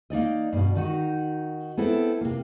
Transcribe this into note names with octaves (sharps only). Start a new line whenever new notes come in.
A#3 D#4 D5 D#5
G2 B2
D#3 D#4 F#4
B3 C4 E4 A4
C3 A#3